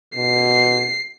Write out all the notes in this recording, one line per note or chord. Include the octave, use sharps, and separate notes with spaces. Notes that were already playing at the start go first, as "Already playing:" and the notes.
B2 C7